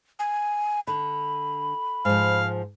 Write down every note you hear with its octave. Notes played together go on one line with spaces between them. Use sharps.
G#5
D3 B5
G#2 F3 F5